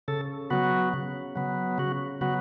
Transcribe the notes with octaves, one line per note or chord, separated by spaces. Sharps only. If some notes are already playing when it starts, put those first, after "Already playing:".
C#3 A4
F#3 B3 F#4
C#3
F#3 B3
C#3 F#4
F#3 B3 F#4